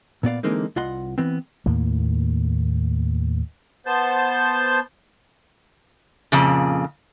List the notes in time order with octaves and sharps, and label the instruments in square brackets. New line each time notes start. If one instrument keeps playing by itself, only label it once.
[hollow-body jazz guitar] A#2 B3 D5 F5
D3 E3 G#3 A#3 C4 D#4
C2 F4 D#5 F#5 C6
E3 B3 C4
[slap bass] D#2 A2 A#3
[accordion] B3 C5 A5 G6
[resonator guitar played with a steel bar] F2 A#2 C#3